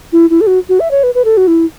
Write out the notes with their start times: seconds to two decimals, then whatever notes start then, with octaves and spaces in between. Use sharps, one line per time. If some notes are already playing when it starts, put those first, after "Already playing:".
0.12 E4
0.30 E4
0.41 A4
0.47 F#4
0.69 F#4
0.80 E5
0.91 C#5
1.03 B4
1.15 B4
1.25 A4
1.37 F#4
1.47 E4